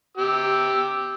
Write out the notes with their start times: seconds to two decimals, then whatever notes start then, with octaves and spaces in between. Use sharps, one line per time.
0.17 G4 E6